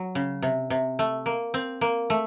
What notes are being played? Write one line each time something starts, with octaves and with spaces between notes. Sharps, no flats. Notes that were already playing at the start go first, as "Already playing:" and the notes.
Already playing: F#3
C#3
C3
C3
A3
A#3
C4
A#3
A3